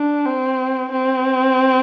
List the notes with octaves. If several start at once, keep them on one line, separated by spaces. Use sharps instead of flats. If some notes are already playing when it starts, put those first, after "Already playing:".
Already playing: D4
C4
C4